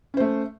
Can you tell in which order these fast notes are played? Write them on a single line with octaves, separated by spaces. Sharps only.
C#4 C5 A3